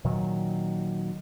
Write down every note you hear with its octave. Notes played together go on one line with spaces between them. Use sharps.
A#2 D#3 F#3